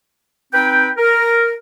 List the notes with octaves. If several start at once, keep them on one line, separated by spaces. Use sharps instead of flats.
C4 D#4 B4 G5
A#4